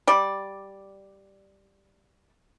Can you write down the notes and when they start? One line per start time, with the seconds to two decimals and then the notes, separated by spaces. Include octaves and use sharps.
0.07 G3 D5